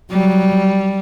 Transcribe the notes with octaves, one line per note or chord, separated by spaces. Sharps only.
F#3 G3